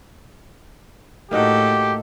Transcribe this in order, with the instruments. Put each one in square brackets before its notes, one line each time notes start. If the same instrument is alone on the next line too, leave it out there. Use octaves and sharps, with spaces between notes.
[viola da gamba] A2 A4 [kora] A#3 D#4 F#4 [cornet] G4